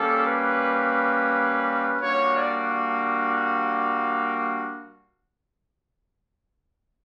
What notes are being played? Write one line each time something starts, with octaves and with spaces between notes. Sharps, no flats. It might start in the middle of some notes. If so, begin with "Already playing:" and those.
Already playing: G3 A#3 C#4 A4
B4
G3 A#3 D4 F#4 C#5
D5